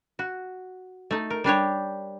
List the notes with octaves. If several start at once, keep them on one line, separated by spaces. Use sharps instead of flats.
F#4
A3 D#4
A#4
G3 D4 G4 C#5